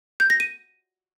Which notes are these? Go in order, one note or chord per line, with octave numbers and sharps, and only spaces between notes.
G6
A#6
D#7